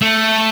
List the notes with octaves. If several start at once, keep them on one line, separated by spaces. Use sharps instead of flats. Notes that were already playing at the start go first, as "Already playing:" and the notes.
A3